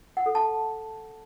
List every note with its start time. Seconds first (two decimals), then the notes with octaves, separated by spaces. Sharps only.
0.17 F#5
0.26 A4
0.35 A5